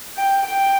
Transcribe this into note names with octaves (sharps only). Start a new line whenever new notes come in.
G5
G5